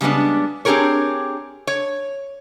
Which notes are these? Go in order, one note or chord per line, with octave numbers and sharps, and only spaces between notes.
C#3 G3 G#3 B3 D4
C4 D4 G4 G#4 A#4 C#5
C#5